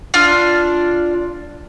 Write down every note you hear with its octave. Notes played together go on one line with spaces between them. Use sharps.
D4 F4 F6